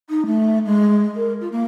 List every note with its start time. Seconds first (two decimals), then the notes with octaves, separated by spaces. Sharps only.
0.09 D#4
0.26 A3
0.65 G#3
1.16 A#4
1.41 F4
1.52 A#3